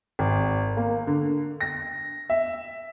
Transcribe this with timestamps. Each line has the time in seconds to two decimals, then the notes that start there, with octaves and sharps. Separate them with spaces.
0.19 G#1
0.77 A#3
1.07 D3
1.60 A#6
2.30 E5